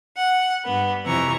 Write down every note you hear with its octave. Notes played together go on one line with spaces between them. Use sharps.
F#5
G2 B3
F2 C3 E3 A#5 C#6